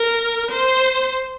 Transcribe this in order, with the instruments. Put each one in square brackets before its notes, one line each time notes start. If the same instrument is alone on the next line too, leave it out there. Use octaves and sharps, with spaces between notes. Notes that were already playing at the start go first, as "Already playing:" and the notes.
Already playing: [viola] A#4
C5